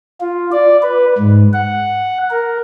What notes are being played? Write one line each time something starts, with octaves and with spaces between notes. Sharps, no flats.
F4
D5
B4
G#2
F#5
A#4